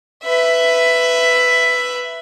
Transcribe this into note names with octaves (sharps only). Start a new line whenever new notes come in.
B4 E5